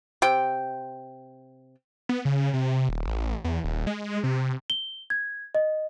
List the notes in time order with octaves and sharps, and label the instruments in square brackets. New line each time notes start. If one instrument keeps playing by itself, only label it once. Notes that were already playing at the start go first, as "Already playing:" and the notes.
[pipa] C3 G5
[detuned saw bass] B3
C#3
C3
D#1
A1
E2
D#1
G#3
C3
[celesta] G7
G#6
D#5